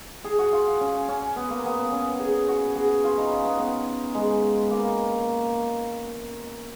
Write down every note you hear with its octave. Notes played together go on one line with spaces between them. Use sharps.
G#4
F#4
F4
C#4
C#4
B3
A#3
B3
B3
C#4
G#4
F#4
G#4
F4
D#4
C#4
B3
B3
G#3
A#3